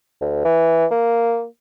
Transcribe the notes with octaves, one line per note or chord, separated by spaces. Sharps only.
D2
E3
A#3